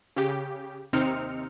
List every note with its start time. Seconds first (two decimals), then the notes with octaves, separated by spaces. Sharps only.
0.16 C#3 G4
0.93 D#2 C3 C4 D#4 F6 C#7